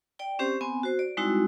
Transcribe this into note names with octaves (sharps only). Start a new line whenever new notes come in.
D5 G5
C4 C#4 G4 C5
B3 C4 G#5
F#4 C5
D5
G3 G#3 C4 D#4 E4 F#4